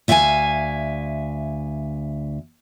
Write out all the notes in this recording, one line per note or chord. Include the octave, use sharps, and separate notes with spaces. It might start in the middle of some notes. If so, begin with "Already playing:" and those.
D2 E5 F5 G5 G#5